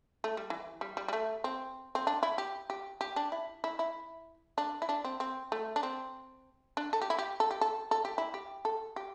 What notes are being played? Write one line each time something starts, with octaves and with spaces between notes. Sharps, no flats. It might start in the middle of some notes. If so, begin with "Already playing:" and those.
A3
G3
E3
G3
G3
G3
A3
C4
C4
D4
E4
G4
G4
G4
D4
E4
E4
E4
D4
E4
D4
C4
C4
A3
D4
C4
D4
A4
G4
E4
G4
A4
G4
A4
A4
G4
E4
G4
A4
G4